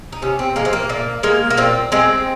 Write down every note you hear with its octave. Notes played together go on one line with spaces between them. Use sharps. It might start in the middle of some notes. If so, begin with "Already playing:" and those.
D#4
C3 C#4
C4
F3 G#3 A#3
C4
A#3
A#2 A#3
G#3 A#3
A#3
A#2 C4
G#3 C4